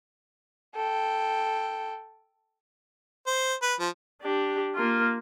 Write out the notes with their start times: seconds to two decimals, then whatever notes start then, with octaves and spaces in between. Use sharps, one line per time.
0.75 A4 G5
3.27 C5
3.62 B4
3.80 F3
4.22 D4 G4
4.75 A#3 F4